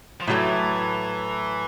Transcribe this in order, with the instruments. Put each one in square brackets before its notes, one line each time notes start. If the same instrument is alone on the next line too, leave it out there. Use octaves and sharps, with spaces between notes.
[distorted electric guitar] F3
[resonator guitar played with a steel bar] A2 F#3 A3 [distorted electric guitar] E3